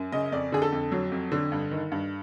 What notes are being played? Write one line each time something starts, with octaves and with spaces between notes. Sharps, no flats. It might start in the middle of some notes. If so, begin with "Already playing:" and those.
Already playing: F#2
C#3 D#5
F2 D5
D3 G#4
A4
F2
F#3
F2
D3
G2
D#3
G2